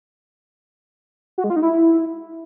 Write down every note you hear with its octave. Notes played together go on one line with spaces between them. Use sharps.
F#4
G#3
F4
D#4
E4